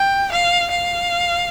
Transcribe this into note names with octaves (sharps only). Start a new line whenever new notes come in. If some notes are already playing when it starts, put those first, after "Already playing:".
Already playing: G5
F5
F5